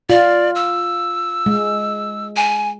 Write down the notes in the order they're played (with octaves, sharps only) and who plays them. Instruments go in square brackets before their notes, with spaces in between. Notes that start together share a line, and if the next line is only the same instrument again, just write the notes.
[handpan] F4 [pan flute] D5
[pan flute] E6
[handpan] G#3
[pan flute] G#5